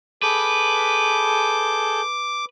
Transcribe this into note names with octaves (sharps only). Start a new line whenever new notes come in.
G#4 A4 B4 D6 G6